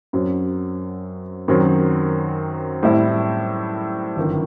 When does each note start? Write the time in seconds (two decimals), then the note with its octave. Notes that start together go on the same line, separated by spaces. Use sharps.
0.13 F#2 F#3 C4
1.48 F#2 D#3 F#3 C4
2.83 A2 G3 C4 E4
4.16 G1 F#2 D#3